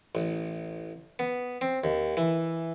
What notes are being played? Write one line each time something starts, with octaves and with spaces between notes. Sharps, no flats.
A1
B3
C4
D#2
E3